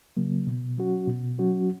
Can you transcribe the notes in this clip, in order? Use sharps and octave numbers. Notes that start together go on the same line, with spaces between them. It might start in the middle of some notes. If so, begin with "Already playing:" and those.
C#3 F#3 A#3
B2
F#3 C#4 F#4
B2
F#3 C#4 F#4